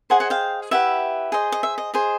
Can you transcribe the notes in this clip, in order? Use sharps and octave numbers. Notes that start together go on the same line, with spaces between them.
G#4 C5 D#5 F#5 G#5
F#5 G#5
F5 G5
E4 G4 B4 E5 F#5
G#4 C5 D#5
D#5
E5
D#5
G#4 C5 D#5